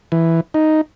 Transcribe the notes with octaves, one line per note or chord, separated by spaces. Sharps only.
E3
D#4